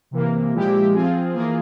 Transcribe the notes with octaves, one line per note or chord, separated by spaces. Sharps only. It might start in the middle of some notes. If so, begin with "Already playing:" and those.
C3 E3 A#3
A#2 F3 G#3 E4 G4
F3 C4 F4 G#4
E3 A#3 F4 G#4